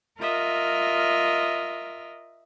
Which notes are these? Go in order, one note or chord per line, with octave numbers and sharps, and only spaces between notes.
F4 A#4 D#5 E5 F6